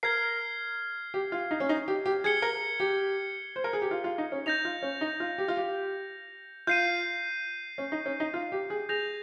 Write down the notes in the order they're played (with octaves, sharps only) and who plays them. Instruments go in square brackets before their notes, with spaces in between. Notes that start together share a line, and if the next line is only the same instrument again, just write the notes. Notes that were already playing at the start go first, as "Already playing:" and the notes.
[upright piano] A#4 [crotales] F6 G#6 C7
[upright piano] G4
F4
D#4
C#4
D#4
G4
G4
[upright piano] G#4 [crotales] G#6 C#7 G7
[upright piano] A#4
G4
C5
A#4
G#4
G4
F4
F4
D#4
C#4
[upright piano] D#4 [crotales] G6 A#6 F7
[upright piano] F4
C#4
D#4
F4
G4
F4
G4
[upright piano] F4 [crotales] G6 C7 D#7
[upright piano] C#4
D#4
C#4
D#4
F4
G4
G#4
[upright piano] G#4 [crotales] G6 A#6 F7